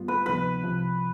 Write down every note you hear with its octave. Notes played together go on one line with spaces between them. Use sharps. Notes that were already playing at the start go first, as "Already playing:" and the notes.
Already playing: G#2 G3 B3 F4
B4
D2 C3 F3 B3 D#4 B4
C2 C3 F3